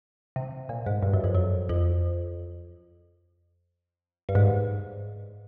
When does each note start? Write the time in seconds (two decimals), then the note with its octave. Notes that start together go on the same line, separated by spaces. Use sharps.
0.36 C3
0.69 A#2
0.86 G#2
1.03 G2
1.13 F#2
1.24 F2
1.35 F#2
1.69 F2
4.29 G2
4.35 G#2